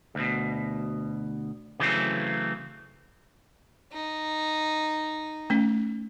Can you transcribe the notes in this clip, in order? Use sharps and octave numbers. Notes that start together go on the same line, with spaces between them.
D2 B2
C#3 E3 F#3 A3 C4
D#4
A3 C#4